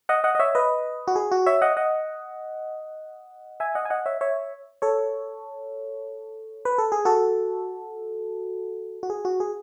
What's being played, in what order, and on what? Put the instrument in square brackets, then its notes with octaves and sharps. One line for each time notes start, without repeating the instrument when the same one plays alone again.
[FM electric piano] D#5 F#5
D#5 F#5
D#5
C#5 E5
B4 D#5
F#4
G#4
F#4
C#5 E5
D#5 F#5
D#5 F#5
E5 G#5
D#5 F#5
G#5
D#5 F#5
C#5 E5
C#5 E5
A4 C#5
B4
A4
G#4
F#4 A4
F#4
G#4
F#4
G#4